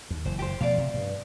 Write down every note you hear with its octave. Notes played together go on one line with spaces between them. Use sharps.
D#2
F#1 E3 C5
G4 C5
B2 F3 A3 D5 F5
C3
G2